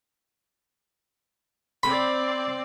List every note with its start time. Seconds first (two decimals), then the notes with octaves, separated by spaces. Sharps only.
1.83 C4 D5 B5